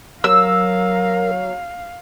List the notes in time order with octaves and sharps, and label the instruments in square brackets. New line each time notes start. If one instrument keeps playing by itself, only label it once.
[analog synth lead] F#3 [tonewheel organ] A#4 [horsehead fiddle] F5 [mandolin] E6